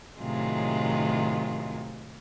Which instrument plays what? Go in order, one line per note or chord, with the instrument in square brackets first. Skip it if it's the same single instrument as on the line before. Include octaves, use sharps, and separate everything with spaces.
[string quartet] A2 C3 D#3 F#3 G#3 F4